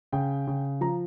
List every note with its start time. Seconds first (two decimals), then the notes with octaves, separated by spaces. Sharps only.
0.13 C#3 G5
0.47 C#3
0.81 F3 A#5